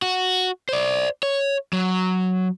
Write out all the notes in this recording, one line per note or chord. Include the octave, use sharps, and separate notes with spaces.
F#4
C5 D5
C#5
F#3